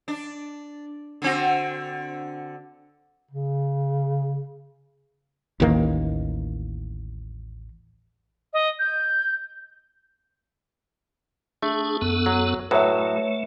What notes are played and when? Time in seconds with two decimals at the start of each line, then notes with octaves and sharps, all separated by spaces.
0.08 D4
1.22 D3 C4 F#4
3.31 C#3
5.60 A1 D#2 D#3 A#3
8.53 D#5
8.79 G6
11.63 A3 D4 G#4
12.01 F#2 B3 A4
12.26 F#3
12.71 A2 F#3 A3 B4 C#5 E5